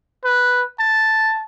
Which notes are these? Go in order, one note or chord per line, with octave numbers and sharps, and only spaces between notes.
B4
A5